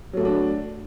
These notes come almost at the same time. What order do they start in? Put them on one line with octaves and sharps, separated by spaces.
F#3 A3 F#4 D4